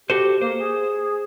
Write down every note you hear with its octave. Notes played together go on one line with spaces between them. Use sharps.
F#4 G4 A4 C5
A#3 C5
G#4